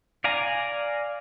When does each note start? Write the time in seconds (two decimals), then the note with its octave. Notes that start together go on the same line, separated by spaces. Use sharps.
0.24 D5 F5 G#5 A#5